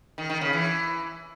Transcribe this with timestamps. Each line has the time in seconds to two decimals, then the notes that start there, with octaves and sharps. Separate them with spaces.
0.18 D#3
0.30 D#3
0.41 C#3
0.53 E3